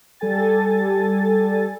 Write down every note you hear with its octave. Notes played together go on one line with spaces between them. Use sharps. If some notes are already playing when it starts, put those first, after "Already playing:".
G3 A4 G#5 A6